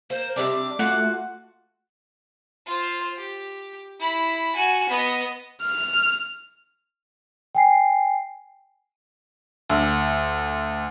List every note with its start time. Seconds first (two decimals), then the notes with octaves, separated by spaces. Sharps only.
0.10 A#3 C5
0.36 C3 G3 D4 D6
0.79 A3 F4 F#4 F#5
2.66 F4 C5
3.16 G4
4.00 E4 B5
4.55 F#4 G#5
4.89 B3 D#5
5.62 F6
7.55 G5 G#5 C7
9.70 D2